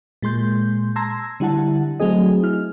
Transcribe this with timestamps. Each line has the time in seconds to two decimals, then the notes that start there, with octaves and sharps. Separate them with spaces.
0.22 A#2 G#3 C6 G6
0.96 A5 A#5 C6 E6 G#6 A#6
1.40 D3 G3 E4 F#5 A5
2.00 F#3 A3 C4 G#4 D#5
2.42 E4 F6